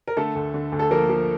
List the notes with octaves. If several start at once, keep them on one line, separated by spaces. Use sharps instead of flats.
A#4
D3 A3 A4
D2
D3
D2
A4
F3 A#3 A#4
F3